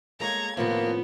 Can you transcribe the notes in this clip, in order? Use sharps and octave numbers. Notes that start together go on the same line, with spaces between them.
G#3 A#3 A4 C#5 F5 A#5 G#6
A2 C3 D#3 F3 A#3 B3 F4 C#6